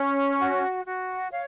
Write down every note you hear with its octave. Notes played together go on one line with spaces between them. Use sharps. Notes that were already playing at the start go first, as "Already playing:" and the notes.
Already playing: C#4
F#4
F#4
C#5 F5